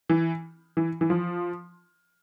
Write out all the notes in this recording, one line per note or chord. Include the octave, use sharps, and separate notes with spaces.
E3
E3
E3
F3